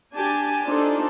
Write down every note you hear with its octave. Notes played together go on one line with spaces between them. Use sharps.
D4 G4 G#5 A5
D4 D#4 F4 A4 C5